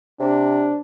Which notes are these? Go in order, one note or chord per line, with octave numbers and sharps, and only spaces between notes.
C3 D4